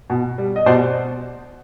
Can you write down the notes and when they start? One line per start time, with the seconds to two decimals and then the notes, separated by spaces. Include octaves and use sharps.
0.10 B2
0.38 G3
0.56 D#5
0.66 B2 C5 D5